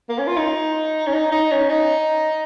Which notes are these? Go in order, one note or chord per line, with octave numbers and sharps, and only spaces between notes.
A#3
C#4
F4
D#4
C#4
D#4
D#4
C#4
D#4